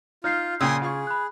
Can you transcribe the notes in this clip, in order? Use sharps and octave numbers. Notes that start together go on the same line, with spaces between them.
D#4 F4 F6 G6 C7
A#2 C#3 G5 G#5 C6 D#6 E6
F4 G#4 F5 C#6
B5 F#6